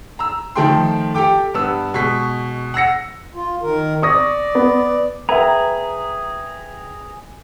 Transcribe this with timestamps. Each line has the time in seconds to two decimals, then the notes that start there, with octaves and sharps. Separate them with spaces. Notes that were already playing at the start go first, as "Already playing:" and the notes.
0.19 A#5 E6
0.56 D#3 F3 A3 G5 C6
1.14 G4 A4 G5 D6
1.54 G2 B3 E6
1.94 B2 G#3 C#6 B6
2.74 F#5 E6 A#6 C#7
3.35 F4
3.62 D#3 A#4
4.02 D5 C#6 D#6 A#6
4.55 B3
5.29 G#4 B4 E5 G5 A#5